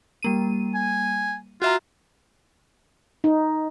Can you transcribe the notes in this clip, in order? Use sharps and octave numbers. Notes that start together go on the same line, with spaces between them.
G3 A#3 D#7
G#5
F4 F#4 E5 A#5
D#4